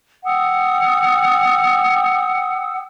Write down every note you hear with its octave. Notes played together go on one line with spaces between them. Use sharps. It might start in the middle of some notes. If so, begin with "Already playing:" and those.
F#5 G5 D#6 E6